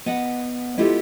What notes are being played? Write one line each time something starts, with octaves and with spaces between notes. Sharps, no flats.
B3 D#5 F#5
G#3 B3 E4 F4 G4 A4